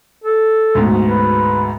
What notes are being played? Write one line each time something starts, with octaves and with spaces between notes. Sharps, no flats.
A4
D2 G#2 B2
B4